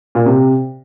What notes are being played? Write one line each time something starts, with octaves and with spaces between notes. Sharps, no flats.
A#2
C3